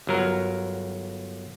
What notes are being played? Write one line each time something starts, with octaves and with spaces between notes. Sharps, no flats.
G1 F#3 A#4